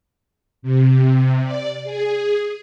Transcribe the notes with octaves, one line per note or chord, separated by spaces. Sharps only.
C3
D5
G#4